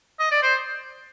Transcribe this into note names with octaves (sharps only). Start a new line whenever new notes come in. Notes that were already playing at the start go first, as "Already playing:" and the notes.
D#5
D5
C5